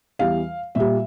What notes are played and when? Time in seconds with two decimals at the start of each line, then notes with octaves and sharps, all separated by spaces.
0.19 E2 E3 G3 F5
0.75 A#2 G3 E5